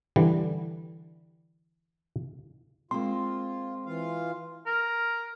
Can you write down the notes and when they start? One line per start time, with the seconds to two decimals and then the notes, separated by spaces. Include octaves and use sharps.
0.16 D3 E3 G3
2.91 G#3 A#3 C4 F4 C6
3.86 E3 F4 F5
4.66 A#4